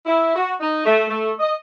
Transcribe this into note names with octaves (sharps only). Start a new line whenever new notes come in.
E4
F#4
D#4
A3
A3
D#5